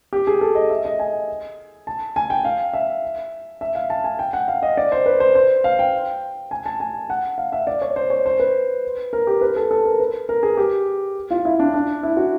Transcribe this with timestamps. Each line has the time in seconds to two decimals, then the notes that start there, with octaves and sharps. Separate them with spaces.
0.13 G4
0.27 G#4
0.41 A4
0.55 D#5
0.70 E5
0.85 D#5
0.99 G#5
1.87 A5
2.16 G#5
2.30 G5
2.45 F5
2.73 E5
3.61 E5
3.75 F5
3.90 A5
4.04 G#5
4.19 G5
4.33 F#5
4.48 F5
4.63 D#5
4.77 D5
4.92 C5
5.06 B4
5.20 C5
5.35 C5
5.64 F5
5.79 G5
6.51 G#5
6.66 A5
6.80 G#5
7.10 F#5
7.38 F5
7.52 E5
7.67 D5
7.82 C#5
7.96 C5
8.10 C#5
8.26 C5
8.40 B4
9.13 A#4
9.27 G4
9.41 B4
9.56 A4
9.71 A4
9.86 A#4
10.00 B4
10.29 A#4
10.43 G#4
10.57 G4
11.31 F4
11.45 E4
11.59 D4
11.74 D4
12.03 E4
12.17 F#4